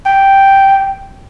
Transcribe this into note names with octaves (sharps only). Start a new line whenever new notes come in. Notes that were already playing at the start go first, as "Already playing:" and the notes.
G5